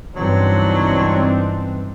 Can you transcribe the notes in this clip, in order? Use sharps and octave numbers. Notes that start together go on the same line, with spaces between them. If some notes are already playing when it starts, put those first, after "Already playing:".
C#2 G2 E3 F#3 C4 D4 D#4